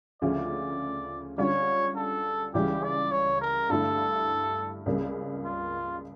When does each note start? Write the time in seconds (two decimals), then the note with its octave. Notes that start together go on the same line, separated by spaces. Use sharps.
0.21 D2 C#3 F3 C#4 F4 D5
1.38 D3 G3 C#4 F4 C#5
1.95 A4
2.54 C#2 C#3 E3 G3 C#4 G4
2.83 D5
3.11 C#5
3.41 A#4
3.69 G2 D3 A3 E4 A4
4.86 C#2 C#3 G3 A#3 C#4
5.45 F4